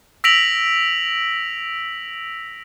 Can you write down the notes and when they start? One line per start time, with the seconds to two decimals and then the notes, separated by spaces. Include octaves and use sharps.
0.24 E6 A#6 B6 D7 F7 F#7